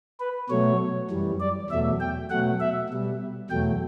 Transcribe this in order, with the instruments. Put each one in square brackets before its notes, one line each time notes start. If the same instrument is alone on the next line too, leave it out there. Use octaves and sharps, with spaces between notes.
[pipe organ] B4
B2 F#3 A3 C#5
F#2 E3 G3
D5
E2 B2 F#3 A3 E5
G5
B2 F#3 A3 F#5
E5
B2 G3
E2 B2 F#3 A3 G5